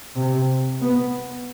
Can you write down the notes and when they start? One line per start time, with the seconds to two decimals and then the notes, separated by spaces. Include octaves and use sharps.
0.15 C3
0.81 B3